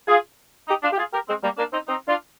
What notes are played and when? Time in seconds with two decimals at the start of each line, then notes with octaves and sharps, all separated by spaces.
0.08 F4 G#4
0.68 D#4 G4
0.83 D4 F4
0.92 G4
0.98 F4 G#4
1.13 G4 A#4
1.28 G#3 C4
1.43 G3 A#3
1.58 A#3 D4
1.73 C4 D#4
1.88 C4 D#4
2.08 D4 F4